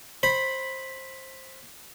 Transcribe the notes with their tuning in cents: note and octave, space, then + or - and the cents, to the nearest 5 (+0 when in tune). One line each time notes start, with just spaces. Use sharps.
C5 +15 B5 +0